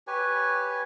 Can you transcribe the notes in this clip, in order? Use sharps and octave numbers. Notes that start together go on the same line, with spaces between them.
G4 B4 C#5 G#5